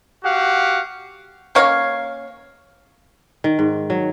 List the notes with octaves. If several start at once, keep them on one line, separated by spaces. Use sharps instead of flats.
F#4 G4 F5 F#5
A#3 C#4 C#5 F5
D#3
G#2
F#3